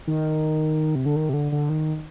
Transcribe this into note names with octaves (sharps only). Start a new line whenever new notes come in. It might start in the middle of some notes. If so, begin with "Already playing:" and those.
D#3
C3
D3
D#3
C3
D3
D3
D#3